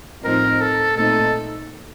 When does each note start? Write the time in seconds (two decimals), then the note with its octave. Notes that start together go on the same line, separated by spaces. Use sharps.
0.24 A2 F3 C4 D#4 A#4
0.61 A4
0.97 A#2 A3 C4 D#4 A4